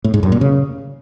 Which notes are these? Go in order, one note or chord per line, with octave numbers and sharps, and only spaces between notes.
A2
G#2
F#2
A#2
C#3